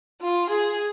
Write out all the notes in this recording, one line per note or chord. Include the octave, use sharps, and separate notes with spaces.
F4
G#4